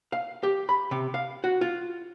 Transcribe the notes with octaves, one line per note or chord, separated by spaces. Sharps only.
F5
G4
B5
C3
F5
F#4
F4